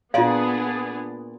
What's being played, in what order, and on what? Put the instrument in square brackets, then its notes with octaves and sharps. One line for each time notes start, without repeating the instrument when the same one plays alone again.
[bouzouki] A#2 D5 [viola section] B3 D4 G#4 [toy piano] F4 F5